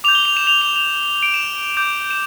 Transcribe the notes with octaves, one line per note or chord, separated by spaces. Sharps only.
D6 G6 F7
G7
F7
E7
F7
F7
F7
D7
E7
D6 G6
E7